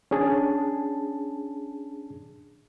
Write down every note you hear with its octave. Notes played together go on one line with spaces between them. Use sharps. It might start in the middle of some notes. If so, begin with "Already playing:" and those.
C#4 D4 G#4 A5